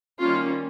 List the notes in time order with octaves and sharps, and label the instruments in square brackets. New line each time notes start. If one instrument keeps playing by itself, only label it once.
[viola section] D#3 G3 A#3 C#4 F4